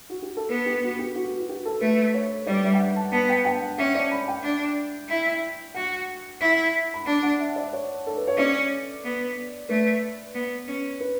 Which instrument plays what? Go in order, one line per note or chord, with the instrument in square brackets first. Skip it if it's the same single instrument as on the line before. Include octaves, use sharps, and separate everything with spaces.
[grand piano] F#4
G4
A4
[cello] B3 [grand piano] B4
[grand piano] G4
F#4
G4
F#4
F#4
G4
A4
[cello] A3 [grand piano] B4
[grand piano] C#5
[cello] G3 [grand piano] D5
[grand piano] E5
G5
F#5
A5
[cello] B3 [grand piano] A5
[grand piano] G5
G5
F#5
[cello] C#4 [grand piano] E5
[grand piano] D5
B5
G5
[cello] D4
E4
[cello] F#4 [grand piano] F#5
[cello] E4
[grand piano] B5
[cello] D4 [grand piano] A5
[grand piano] F#5
E5
D5
C#5
A4
B4
C#5
[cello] C#4 [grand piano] D5
[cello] B3
[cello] A3 [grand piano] B4
[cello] B3
C#4
[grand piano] B4